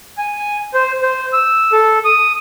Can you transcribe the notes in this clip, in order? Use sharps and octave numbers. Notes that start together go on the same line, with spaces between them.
G#5
C5
C5
E6
A4
D#6